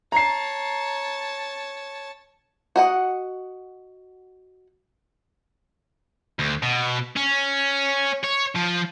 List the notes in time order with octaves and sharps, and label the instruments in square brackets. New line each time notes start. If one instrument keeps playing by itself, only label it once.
[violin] C#5 A5 [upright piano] A#5 C7
[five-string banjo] F#4 D#5 F#5
[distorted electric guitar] D2
B2
C#4
C#5
F3